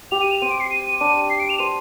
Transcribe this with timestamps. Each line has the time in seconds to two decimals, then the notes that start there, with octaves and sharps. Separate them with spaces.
0.11 G4 F7
0.21 D#7
0.31 F7
0.41 C4 D#7
0.51 D7
0.60 C7
0.71 D#7
0.85 D#7
1.00 D4 D#7
1.30 C7
1.40 D7
1.50 F7
1.59 C5 D#7